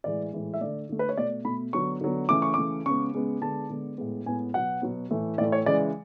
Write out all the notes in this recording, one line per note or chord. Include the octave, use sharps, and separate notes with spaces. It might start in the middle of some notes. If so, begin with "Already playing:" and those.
A2 E3 G#3 D5
A2 E3 G#3
E5
D3 A3 D5
D3 A3
B4
C#5
B2 A3 D5
B2 A3 B5
D3 F#3 B3 C#6
D3 F#3 B3
C#3 E3 A3 D6
C#6
C#3 E3 A3 D6
C#3 G#3 B3 C#6
C#3 G#3 B3
D3 G#3 B3 A5
D3 G#3 B3
A2 G#3 B3
A2 G#3 B3 G#5
B2 F#3 B3 F#5
B2 F#3 B3
A2 E3 A3
A2 E3 A3 D5
C#5
C#3 E3 G#3 D5